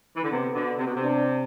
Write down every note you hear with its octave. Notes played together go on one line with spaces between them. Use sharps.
E3
D3
C3 B3
B2 D3
C3
B2
C3
D4